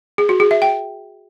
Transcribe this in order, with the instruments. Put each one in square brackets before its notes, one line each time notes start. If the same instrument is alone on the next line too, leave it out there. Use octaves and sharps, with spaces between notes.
[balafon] G#4
F#4
G#4
E5
G5